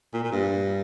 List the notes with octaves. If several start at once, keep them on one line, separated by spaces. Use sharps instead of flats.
A#2
A#2
G2